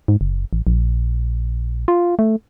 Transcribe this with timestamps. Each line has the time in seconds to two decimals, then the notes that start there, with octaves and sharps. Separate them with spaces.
0.08 G#2
0.21 F#1
0.53 A1
0.67 A#1
1.88 F4
2.19 A3